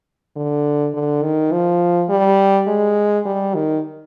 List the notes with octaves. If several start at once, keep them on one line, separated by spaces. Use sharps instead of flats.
D3
D3
D#3
F3
G3
G#3
G3
D#3